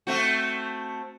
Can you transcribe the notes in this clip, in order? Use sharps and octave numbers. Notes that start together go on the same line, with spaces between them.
A3 C4 F#4